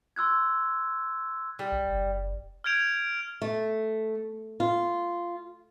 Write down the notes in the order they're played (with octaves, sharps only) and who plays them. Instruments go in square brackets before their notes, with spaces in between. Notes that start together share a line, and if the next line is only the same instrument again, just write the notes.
[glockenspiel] C6 E6 F#6 G#6
[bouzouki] G3
[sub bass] B1
F#1
[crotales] F6 G6 G#6 D7 F7
[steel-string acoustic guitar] A3
F4